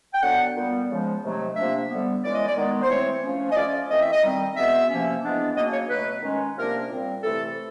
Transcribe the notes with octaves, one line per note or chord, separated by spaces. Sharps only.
G5
D3 F#3 B3 D4 F#5
A#2 G3 B3
C#3 F3 G#3
C3 D#3 F#3 A3
C3 F3 A#3 D4 E5
D3 G3 B3
A2 E3 G#3 C#4 D5
D#5
D5
D#3 G#3 B3
C5
E3 A3 C4 C#5
F3 A3 C#4
D#5
F3 A3 C#4 D5
E3 A3 C4 D#5
E5
D#5
D#3 G3 C4
B2 G#3 B3 E5
C3 F3 A#3 C#4
E3 G#3 B3 D4
C#3 F#3 A#3 D4 D#5
C#5
B2 F#3 A3 B4
D#3 G#3 C#4
C3 F3 A#3 D4 A#4
A#2 G3 C4
C3 E3 A3 A4